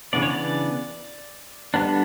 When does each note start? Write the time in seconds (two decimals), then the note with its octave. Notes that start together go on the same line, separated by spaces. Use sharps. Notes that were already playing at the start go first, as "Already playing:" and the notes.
0.13 C#3 E3 B3 D4 D5
0.22 C#5
0.30 D5
1.74 D3 G3 B3 D4